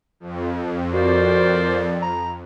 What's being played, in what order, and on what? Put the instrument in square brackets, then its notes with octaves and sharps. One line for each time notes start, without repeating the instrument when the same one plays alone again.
[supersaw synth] F2
[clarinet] F#4 [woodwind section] A#4 C5 D5
[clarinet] A#5